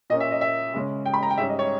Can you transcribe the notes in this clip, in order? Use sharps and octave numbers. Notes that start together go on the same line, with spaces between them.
A#2 A#3 C#4 D#5
E5
D#5
E5
C#3 G#3 C#4
G5
B5
A#5
G5
G#2 G3 C#4 E5
D#5
C#5